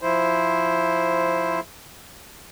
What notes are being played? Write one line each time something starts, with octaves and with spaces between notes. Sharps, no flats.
F3 E4 C5